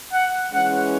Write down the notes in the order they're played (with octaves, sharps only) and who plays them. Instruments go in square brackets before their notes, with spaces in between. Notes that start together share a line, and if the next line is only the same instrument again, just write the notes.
[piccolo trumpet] F#5
[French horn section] E3 G#3 C#4 [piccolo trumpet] F#5